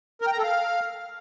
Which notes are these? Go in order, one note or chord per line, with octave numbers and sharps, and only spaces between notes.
A#4
G5
A#5
A4
F5